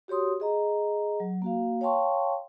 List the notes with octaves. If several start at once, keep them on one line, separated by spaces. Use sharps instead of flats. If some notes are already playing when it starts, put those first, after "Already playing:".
F#4 G4 C#5 C6 D#6
G#4 D#5 A#5
F#3
A#3 F#4 F5
C#5 F5 G5 A5 C6 C#6